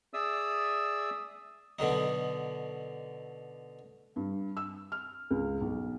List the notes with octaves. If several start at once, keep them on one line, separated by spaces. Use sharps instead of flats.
G#4 D5 E5 D#6 E6
B2 D3 F#3 D#4
G2
E6
F6
C#2
B1